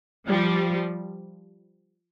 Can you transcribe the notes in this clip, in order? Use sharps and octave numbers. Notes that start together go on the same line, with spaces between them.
F3 G3